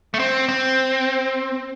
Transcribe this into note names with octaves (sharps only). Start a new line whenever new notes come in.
A3
C4
C4